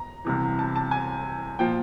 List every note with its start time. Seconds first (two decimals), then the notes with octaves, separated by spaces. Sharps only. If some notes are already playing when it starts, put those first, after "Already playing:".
Already playing: A#5
0.25 C2 C3 E3
0.59 A5
0.76 A5
0.91 G#5
1.59 A#2 F3 G5